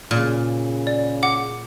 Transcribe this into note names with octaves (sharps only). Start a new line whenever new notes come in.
A#2 C#3
D5
F#5 D6